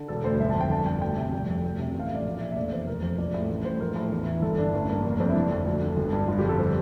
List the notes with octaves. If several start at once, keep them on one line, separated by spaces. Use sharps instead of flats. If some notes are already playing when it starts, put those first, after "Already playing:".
Already playing: D3
E1 A4
D2 C5
G1 E5
F2 A5
G5
G1 A5
G2 G5
D2 G5
C3
F1
F2
D2
C3
A1
F5
E5
A2 D5
A#1
D5
A#2 E5
E5
F1 D5
E2 C5
F1 A#4
F2 C5
A#1 D5
A2 D5
A1
A2 C5
A#1 A#4
A2
E2
E3
G1 A4
G2 D4
A1 D4
G2 A#3
F1 A#3
D4
F2 C4
E4
G1 D4
F2
D2
D3
G1
G2
G1 F4
G4
F2
A4
C5